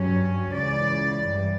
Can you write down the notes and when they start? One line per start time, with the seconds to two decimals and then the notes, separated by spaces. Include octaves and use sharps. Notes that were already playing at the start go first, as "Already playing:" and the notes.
Already playing: G2 F#3 C#4
0.53 C#2 C#3 E3 D5
1.22 G2 E3 G3